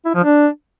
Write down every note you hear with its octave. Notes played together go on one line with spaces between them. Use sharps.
E4
F3
D4